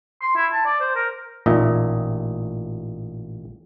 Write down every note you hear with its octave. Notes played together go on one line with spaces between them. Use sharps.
C6
E4
A5
D5
C5
A#4
A1 A#2 D#4 D#5 E5